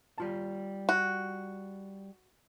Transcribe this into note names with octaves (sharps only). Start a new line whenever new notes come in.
G3 F4 A5
F#4